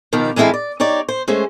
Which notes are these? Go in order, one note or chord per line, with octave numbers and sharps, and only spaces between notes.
B2 D#3 F3 G4
E3 G#3 C4 E4 A4 F5
D5
D#4 G4 C#5 D5
C5
G#3 A3 C#4 C5